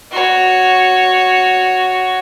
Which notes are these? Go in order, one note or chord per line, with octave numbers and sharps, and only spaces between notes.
F#4 C#5